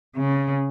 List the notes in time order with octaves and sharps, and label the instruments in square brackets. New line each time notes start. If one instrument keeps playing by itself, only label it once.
[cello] C#3